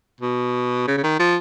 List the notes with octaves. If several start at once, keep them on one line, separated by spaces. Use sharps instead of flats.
B2
C#3
C#3
D#3
F3